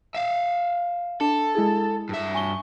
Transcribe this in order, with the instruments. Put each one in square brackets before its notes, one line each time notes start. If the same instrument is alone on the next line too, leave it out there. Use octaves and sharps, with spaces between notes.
[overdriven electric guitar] E5 F5
[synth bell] D4 [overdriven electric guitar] A4
[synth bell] G#3 E4 G#4
[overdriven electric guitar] G2 E5
[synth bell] G#5 C#6 G7